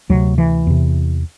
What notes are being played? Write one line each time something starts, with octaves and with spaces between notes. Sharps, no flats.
D2 C3 F#3
E3
E2 C3